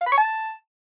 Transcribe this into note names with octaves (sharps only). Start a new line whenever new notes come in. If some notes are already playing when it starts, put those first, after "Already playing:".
F5
B5
C#6
A5